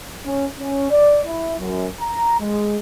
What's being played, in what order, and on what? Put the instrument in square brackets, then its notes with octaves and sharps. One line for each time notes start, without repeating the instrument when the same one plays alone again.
[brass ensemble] C#4
C#4
D5
E4
F#2
A#5
G#3